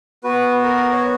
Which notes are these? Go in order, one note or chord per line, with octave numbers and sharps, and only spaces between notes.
B3 F#4 B4
A#4
C#5